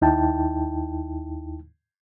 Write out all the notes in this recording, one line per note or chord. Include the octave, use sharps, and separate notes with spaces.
D#2 D#4 E4 G5 A5